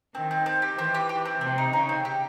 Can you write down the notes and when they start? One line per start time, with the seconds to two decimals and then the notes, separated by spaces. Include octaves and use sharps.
0.15 D#3 C4
0.31 C4
0.46 C4
0.62 G4
0.78 E3 C4
0.94 G4
1.09 G4
1.25 C4
1.41 C3 C4
1.58 D#4
1.73 C#3 D#4
1.89 C4
2.05 G4